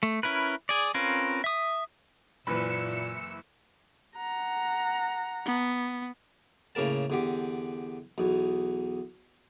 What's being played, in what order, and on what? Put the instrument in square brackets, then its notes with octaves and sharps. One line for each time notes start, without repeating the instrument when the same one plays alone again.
[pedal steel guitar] A3
C#4 E4 A#4 B4
G#4 D5
C4 C#4 F4 A#4 B4
E5 D#6
[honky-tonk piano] F#1 E3 [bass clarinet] A#2 [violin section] E4 E6 C#7 [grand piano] B4 B5
[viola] F#5 A#5
[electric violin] B3
[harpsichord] A2 C#3 A#3 A#4 A5
E2 D3 G4
B1 E2